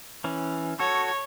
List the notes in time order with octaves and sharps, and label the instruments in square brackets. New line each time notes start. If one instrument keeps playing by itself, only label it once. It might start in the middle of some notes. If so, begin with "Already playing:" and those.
[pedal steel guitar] E3 C#4
[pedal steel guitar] F#4 A4 [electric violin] C#5